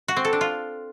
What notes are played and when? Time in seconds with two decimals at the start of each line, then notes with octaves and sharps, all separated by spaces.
0.08 F#4
0.17 C4
0.25 A4
0.33 D4
0.41 F4